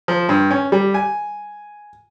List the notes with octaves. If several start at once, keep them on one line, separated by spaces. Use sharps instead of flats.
F3
G2
C#4
G3
G#5